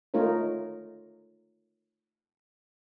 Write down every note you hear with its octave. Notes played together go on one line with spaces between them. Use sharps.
A3 D#4 F4 A#4 C#5